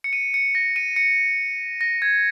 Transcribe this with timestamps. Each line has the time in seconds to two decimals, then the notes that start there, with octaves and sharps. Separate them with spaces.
0.04 C#7
0.13 D#7
0.34 C#7
0.55 A#6
0.76 D#7
0.96 C#7
1.81 A#6
2.02 G#6